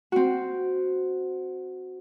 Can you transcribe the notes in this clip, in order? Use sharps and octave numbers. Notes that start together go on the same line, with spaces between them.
C4 F#4